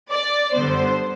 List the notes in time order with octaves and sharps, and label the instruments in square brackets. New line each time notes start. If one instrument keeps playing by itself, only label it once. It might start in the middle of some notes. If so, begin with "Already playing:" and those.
[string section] D5
F#2 D3 G3 B3 C5